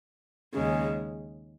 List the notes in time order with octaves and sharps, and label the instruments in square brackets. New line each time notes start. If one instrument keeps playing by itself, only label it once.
[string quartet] D#2 C#3 G#3